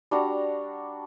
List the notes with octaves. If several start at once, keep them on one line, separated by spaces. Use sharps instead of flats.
G3 D4 F#4 A#5